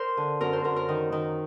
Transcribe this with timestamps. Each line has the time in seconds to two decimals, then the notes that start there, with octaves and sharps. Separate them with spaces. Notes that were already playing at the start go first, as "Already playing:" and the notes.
Already playing: A#4 C5
0.17 D3
0.41 F#2 A#4
0.53 C5
0.64 F#2 A#4
0.76 A#4
0.89 D#3
1.12 D#3